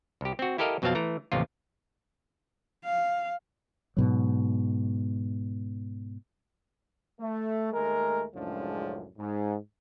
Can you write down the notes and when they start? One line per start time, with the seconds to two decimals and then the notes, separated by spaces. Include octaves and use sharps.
0.21 C2 G4
0.39 C4 F#4
0.58 E4 G4 A4 A#4 D#5 F5
0.82 F2 B2 F#3 C4 F5 A5
0.95 E3 A3 A#5
1.32 A1 D#2 C3 F3 F4
2.85 F5
3.97 G#2 B2 F#3
7.20 A3
7.73 D#2 G#3 A3 A#4
8.35 C#2 F#2 A2 F3 G#3 D4
9.18 G#2